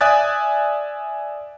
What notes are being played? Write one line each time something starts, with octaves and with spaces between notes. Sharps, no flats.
D5 E5 G#5 D#6 F#6 A6